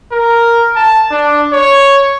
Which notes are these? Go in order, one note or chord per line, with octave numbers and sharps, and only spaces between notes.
A#4
A5
D4
C#5